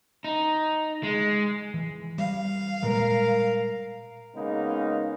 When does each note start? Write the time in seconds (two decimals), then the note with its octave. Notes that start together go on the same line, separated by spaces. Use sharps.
0.24 D#4
1.03 G#3
1.74 E3
2.18 G3 F5
2.83 A#2 G3 G#3 A#4
4.35 C#3 G#3 A#3 B3 D#4